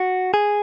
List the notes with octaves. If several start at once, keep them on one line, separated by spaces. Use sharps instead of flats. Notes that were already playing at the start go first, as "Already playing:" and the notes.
Already playing: F#4
G#4